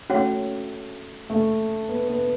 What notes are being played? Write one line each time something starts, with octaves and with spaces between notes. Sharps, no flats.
A3 C#4 F#4 C#5 F#5
A3
B3
B3